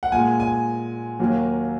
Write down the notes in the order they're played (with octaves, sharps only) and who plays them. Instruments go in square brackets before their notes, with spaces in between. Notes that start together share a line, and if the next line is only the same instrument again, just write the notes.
[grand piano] F#5
A#2 G#3 G#5
G#5
D#2 D#3 F#3 A#3